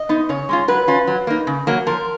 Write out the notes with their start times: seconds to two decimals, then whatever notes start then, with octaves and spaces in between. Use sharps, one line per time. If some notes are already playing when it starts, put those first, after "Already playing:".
Already playing: D#5
0.09 B3 D#4
0.29 C#3 C#5
0.49 G#3 C#4 F4
0.68 F#3 B4
0.88 C#4 F4
1.07 F#3
1.27 A#3 D#4
1.47 C#3
1.67 F#3 A#3
1.87 F3 A#4